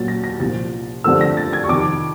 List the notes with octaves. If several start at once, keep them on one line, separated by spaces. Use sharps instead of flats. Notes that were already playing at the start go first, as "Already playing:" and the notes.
Already playing: A#2 F#3 A#3 C#4 A6
A#6
A#6
C2 A#2 F3 A6
G2 D3 F3 A3 C4 E6
A#6
A6
G#6
C#6
F2 C3 D#3 D6